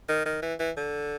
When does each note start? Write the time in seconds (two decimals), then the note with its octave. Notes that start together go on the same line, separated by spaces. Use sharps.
0.09 D#3
0.25 D#3
0.42 E3
0.59 E3
0.77 D3